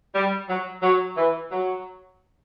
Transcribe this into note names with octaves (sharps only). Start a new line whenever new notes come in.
G3
F#3
F#3
E3
F#3